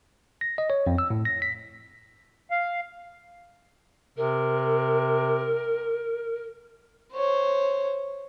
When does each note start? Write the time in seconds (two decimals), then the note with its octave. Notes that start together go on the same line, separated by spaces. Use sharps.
0.41 A#6
0.58 D#5
0.70 C#5
0.87 F2
0.98 E6
1.10 A2
1.25 A#6
1.42 B6
2.51 F5
4.17 C3 A#4
7.14 C5 C#5